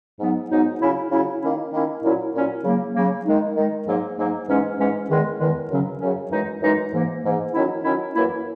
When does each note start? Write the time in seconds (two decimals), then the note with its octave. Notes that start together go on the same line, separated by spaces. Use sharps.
0.19 G#2 F#3 B3 D#4
0.50 G#2 F#3 B3 D#4
0.80 C#3 F#3 C#4 E4
1.10 C#3 F#3 C#4 E4
1.41 D#3 A#3 C#4 E4
1.72 D#3 A#3 C#4 E4
2.02 A#2 F#3 C#4 E4
2.33 A#2 F#3 C#4 E4
2.64 C#3 F#3 A#3
2.94 C#3 F#3 A#3
3.25 D#3 G#3 D#4
3.56 D#3 G#3 D#4
3.86 G#2 F#3 A#3
4.17 G#2 F#3 A#3
4.47 G#2 E3 G#3 C#4
4.77 G#2 E3 G#3 C#4
5.09 E2 D#3 G#3
5.39 E2 D#3 G#3
5.69 F#2 C#3 F#3 C#4
5.99 F#2 C#3 F#3 C#4
6.30 F#2 E3 G#3 D#4
6.61 F#2 E3 G#3 D#4
6.92 G#2 E3 A#3
7.23 G#2 E3 A#3
7.53 D#3 F#3 C#4 E4
7.83 D#3 F#3 C#4 E4
8.14 F#2 E3 A#3 E4